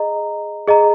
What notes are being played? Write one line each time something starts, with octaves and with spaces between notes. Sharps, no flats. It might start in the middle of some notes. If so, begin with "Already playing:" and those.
Already playing: G#4 D#5 A#5
G#4 D#5 A#5